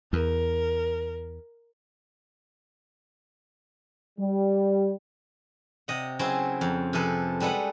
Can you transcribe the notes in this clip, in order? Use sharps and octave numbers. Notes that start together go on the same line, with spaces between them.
E2 A#4
G3
C3 D#5 F#5
C#3 F#3 C4 E4 G#4 C5
F2
C3 F3 G#4 A4 B4
G3 G#3 A4 B4 F#5